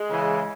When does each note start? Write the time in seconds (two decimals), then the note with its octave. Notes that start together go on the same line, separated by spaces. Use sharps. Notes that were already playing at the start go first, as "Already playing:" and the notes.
Already playing: G#3
0.10 C#3 E3